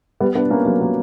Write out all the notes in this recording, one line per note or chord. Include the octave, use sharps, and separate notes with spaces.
G3 B3
B3 D4
A#3 C#4
F#3 A#3
F#3 A#3